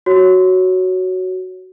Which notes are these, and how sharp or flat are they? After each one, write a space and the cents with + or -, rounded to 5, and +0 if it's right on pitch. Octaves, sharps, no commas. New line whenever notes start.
F#4 +5 C#5 +0